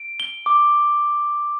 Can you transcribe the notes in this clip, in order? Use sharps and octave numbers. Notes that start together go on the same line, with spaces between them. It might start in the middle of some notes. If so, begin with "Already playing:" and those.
Already playing: D7
G7
D6